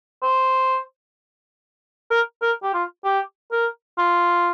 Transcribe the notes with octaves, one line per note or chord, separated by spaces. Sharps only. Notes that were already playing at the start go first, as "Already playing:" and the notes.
C5
A#4
A#4
G4
F4
G4
A#4
F4